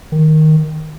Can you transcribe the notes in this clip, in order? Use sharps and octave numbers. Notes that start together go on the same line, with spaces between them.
D#3